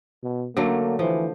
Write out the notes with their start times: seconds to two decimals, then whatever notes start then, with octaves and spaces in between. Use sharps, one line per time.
0.24 B2
0.57 D3 F#3 A3 A#3
0.99 E3 F3